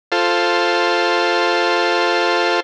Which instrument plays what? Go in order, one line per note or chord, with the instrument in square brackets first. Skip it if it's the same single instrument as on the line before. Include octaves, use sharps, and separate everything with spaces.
[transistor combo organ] F4 A4 C5